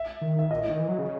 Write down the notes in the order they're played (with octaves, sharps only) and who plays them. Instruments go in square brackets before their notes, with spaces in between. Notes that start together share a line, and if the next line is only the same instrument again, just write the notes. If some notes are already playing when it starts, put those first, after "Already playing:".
Already playing: [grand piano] E5
[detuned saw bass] D#3
[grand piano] E5
[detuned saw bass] A#2 [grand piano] D#5
[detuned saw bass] A2
D#3
E3
F#3
C#3